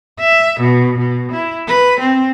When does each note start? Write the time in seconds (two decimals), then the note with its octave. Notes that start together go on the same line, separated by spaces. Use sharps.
0.19 E5
0.60 B2
0.98 B2
1.32 E4
1.68 B4
2.00 C4